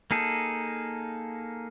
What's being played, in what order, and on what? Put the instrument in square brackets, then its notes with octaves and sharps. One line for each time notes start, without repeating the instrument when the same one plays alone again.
[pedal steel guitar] A#3 D#4 G#4 A4